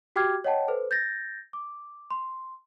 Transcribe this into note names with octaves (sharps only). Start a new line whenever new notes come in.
F#4 G4 G5 D6 F6 G#6
C#5 D#5 F#5 G5 A5
A4 B4 C5
G6 A6 A#6
D6
C6